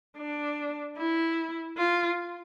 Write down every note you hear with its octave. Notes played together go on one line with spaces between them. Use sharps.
D4
E4
F4